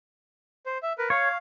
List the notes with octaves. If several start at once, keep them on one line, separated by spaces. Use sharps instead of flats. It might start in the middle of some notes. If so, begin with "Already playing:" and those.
C5
E5
A#4 B4
C#5 F5